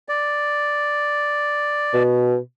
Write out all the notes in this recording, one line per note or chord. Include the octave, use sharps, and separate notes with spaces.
D5
B2